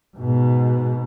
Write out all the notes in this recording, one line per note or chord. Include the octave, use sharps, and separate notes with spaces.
G#2 B2